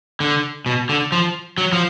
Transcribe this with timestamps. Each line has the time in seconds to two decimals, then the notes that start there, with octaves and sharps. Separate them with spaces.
0.20 D3
0.66 B2
0.89 D3
1.12 F3
1.58 F#3
1.73 F3